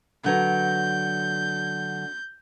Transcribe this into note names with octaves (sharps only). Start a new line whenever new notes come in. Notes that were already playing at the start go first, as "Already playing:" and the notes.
D3 F#3 B4 G6